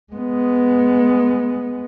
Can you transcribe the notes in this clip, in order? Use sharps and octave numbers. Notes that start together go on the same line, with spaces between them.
G#3 B3